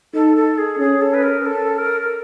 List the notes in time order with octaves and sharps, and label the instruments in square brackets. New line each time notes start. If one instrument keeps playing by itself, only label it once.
[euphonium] D#4 [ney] A4
[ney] A4
G#4
[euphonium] C#4 [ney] G#4
[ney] A4
B4
A#4
A4
A#4